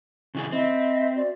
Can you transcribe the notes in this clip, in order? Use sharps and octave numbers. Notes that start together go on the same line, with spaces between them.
C#3 E3 G#4
C4 D#5 E5 B5
F#4 D5